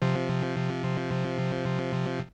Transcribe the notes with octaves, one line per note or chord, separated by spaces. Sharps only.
C3 F3